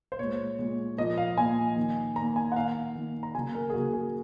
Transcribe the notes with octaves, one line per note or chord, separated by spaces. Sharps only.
C5
A#2 G#3 C#5
A#2 G#3
A#2 F3 A#3 D#5
F5
A#2 F3 A#3 G#5
D#3 A#3
D#3 A#3 A#5
G#5
F#5
D#3 A#3 F5
D#3 A#3
A#5
C#3 F#3 A#3 G#5
A#4
G#4
C#3 F#3 A#3 F#4
G#4